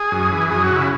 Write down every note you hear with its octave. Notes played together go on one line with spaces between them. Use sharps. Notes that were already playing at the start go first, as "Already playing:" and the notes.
Already playing: G#4
F#2
E3
F#2 G#4
F#4
C#3 E4